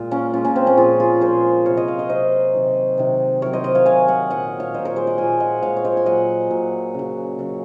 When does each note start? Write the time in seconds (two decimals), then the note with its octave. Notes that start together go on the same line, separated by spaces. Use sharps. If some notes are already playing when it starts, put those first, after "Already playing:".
Already playing: A#2 G#3 F4
0.11 A#3 C#4
0.33 A#2 G#3 C#4 F4
0.45 A#3 C#4
0.56 C4
0.67 A#3 C#4
0.77 A#2 F3 G#3 F4 G#4
1.00 F4 G#4
1.21 A#2 F3 G#3 G#4 C5
1.66 C3 F#3 A#4 C#5
1.77 C5 D#5
1.87 C#5 F5
1.99 C5 D#5
2.09 C3 F#3 C5 D#5
2.54 C3 D#3 F#3
2.98 C3 D#3 F#3
3.42 C3 F#3 A#4 C#5
3.53 C5 D#5
3.64 C5 D#5
3.75 C#5 F5
3.86 C3 F#3 F5 G#5
4.08 D#5 F#5
4.30 A#2 F#3 D#5 F#5
4.60 C#5 F5
4.74 A#2 F#3 C5 D#5
4.85 A#4 C#5
4.96 G#4 C5
5.07 D#5 F#5
5.18 A#2 F3 G#3 F5 G#5
5.40 D#5 F#5
5.62 A#2 F3 G#3 C#5 F5
5.77 C#5
5.85 C5 D#5
5.97 G#5
6.06 A#2 F#3 D#5 F#5
6.50 A#2 F#3
6.95 C#3 F#3
7.39 C#3 F#3